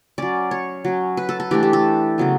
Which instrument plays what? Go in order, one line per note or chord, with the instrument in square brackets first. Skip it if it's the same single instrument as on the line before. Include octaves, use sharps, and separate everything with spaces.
[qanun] F#3 C#4 D5
C#5
F#3 C#4
B4
A4
A4
E3 A3 D4 G4
G4
A4
C#3 F#3 B3